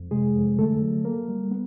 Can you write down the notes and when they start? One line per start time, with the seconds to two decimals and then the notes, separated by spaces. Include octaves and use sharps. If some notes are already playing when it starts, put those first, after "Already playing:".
Already playing: F2
0.11 C3 G#3 G#4
0.35 F2
0.58 D3 A3 A4
0.82 F#3
1.05 A#3 A#4
1.29 G3
1.51 B3